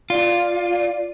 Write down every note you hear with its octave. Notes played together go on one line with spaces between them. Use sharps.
F4 D5